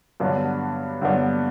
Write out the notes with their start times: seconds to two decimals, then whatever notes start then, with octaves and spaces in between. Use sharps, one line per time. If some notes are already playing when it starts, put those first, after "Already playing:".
0.20 G2 D3 F#3 B3 D4
1.02 G2 D3 F#3 B3 D4